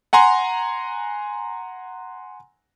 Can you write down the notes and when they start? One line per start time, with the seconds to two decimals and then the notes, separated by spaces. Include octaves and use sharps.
0.13 F#5 G#5 A#5 C6